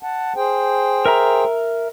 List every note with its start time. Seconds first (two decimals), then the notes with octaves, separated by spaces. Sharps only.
0.03 F#5 A5
0.36 G#4 C5 G5
1.06 A#4 E5 A#5